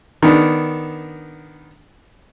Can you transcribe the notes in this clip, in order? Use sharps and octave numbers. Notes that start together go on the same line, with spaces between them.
D#3 B3 D4